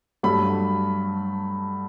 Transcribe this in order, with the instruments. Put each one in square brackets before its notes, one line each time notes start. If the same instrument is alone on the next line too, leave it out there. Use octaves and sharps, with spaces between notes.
[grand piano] G2 F#3 A3 B5